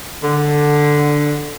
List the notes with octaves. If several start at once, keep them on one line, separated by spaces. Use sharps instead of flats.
D3